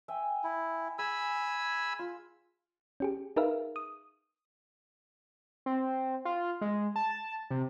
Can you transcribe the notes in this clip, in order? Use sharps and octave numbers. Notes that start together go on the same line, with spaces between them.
E5 G5 G#5
E4
G#4 F#5 G#5 B5 E6
F4
C#4 G4 G#4
D#4 G#4 A#4 B4 E5 F5
D#6
C4
F4
G#3
A5
C3